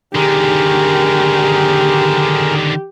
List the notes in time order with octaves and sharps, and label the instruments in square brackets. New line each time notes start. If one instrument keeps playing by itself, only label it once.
[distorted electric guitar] D3 D#3 [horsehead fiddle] G4 [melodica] G#4 A#4